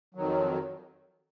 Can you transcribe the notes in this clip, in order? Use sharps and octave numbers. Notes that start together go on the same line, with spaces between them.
F2 D#3 F#3